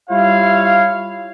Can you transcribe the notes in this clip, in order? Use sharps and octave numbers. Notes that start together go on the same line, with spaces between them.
G3 E4 F4 C#5 F5